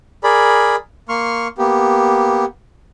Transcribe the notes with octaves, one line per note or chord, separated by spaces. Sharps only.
G#4 A#4 D5 B5
A#3 C6 C#6 F6
A#3 B3 G4